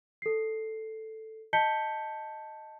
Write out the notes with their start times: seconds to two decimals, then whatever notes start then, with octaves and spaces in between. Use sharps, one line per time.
0.22 A4 C7
1.53 D#5 A5 G6 B6 C#7 G7